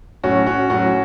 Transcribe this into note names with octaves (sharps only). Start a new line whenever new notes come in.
A2 F#3 C#4 F#4
C#4 F#4
A2 F#3 C#4 F#4